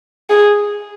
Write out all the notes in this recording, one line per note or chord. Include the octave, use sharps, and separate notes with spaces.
G#4